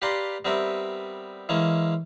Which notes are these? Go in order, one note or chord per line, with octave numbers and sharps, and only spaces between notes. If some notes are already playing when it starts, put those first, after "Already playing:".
G4 B4 D5 F5 A#5 C6
G3 B3 C4 A#4 E5
E3 G#3 A#3 C#4